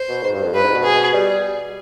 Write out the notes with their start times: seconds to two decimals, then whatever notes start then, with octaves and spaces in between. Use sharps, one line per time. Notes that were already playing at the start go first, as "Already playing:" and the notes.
Already playing: C5
0.09 B2
0.23 G#2
0.34 G2
0.43 F2
0.53 G2 B4
0.64 G#2
0.74 B2
0.84 G#4
1.14 G3